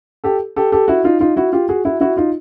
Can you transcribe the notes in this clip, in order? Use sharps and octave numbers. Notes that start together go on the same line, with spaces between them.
G4 A4
G4 A4
G4 A4
E4 F#4
D#4 F4
D#4 F4
E4 F#4
F4 G4
F#4 G#4
E4 F#4
E4 F#4
D#4 F4